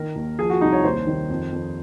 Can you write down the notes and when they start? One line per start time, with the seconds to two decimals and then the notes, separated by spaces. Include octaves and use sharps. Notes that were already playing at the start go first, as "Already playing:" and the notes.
Already playing: D#3 A#4
0.16 D#2
0.39 F3 G#4
0.50 F#4
0.61 C2 D#4
0.73 C#5
0.84 D#2 C5
1.07 D#3
1.30 F2
1.52 F2